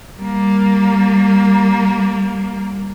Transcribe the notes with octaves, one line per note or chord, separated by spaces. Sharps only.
G3 A#3